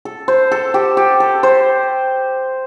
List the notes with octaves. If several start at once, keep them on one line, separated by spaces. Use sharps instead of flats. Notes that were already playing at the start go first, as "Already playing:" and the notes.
A4
C5
A4
G4
G4
A4
C5